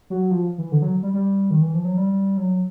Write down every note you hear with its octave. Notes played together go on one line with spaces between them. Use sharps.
F#3
F3
E3
D3
F#3
G3
G3
D#3
E3
F3
F#3
G3
F#3